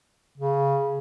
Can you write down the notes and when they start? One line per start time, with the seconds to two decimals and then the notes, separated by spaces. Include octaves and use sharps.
0.38 C#3